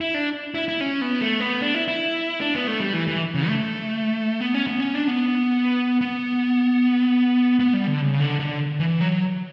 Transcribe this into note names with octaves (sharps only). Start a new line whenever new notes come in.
E4
D4
E4
E4
C#4
B3
A3
B3
D4
E4
E4
D4
B3
A3
G3
E3
E3
C#3
A3
B3
C#4
B3
C#4
D4
B3
B3
B3
G3
D3
C#3
D3
D3
E3
F#3